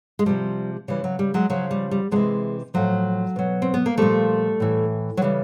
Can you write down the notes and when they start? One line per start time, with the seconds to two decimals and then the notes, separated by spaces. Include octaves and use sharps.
0.19 G#3
0.26 C3 F3 G3
0.88 C#3 E3 G3
1.04 F#3
1.19 G3
1.34 F#3 G#3
1.50 C#3 F3 F#3
1.71 G3
1.91 G3
2.11 C3 E3 F#3 G#3
2.74 A2 F3 F#3
3.36 B2 F#3
3.62 C4
3.74 B3
3.86 A#3
3.98 A#2 F3 G3 A3
4.60 A2 E3
5.17 F#3
5.22 C#3 E3 G3